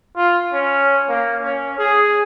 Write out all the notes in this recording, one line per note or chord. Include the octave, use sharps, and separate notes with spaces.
F4
C#4
A#3
C#4
G#4